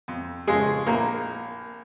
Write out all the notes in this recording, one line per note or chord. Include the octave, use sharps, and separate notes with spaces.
F2
C#3 F3 G#3 G#4
A#1 A#3 A#4